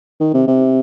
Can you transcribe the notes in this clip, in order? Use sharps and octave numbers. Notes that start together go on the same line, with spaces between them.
D#3
C3
C3